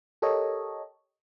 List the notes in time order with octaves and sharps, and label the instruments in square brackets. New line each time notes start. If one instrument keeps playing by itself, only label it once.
[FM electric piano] G4 A4 A#4 C#5 D#5